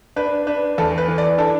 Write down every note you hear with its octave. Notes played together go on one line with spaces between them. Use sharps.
D4 B4
D4 B4
E2 A4
B4
E3
D5
D4 A4